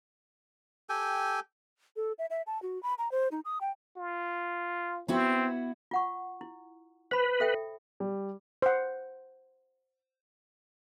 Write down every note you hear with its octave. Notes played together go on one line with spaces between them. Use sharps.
G4 A4 G5 G#5
A4
E5
E5
A5
F#4
B5
A#5
C5
D#4
D#6
G5
F4
B3 C4 E4 F#4
F4 F#5 C#6
E4
B4 C5 B5
A4 E5 G5
G3
C5 F#5